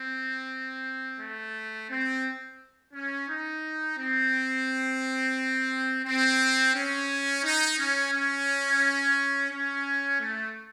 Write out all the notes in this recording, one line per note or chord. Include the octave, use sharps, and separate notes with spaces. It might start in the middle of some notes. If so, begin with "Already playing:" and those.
Already playing: C4
A3
C4
C#4
D#4
C4
C4
C#4
D#4
C#4
C#4
C#4
A3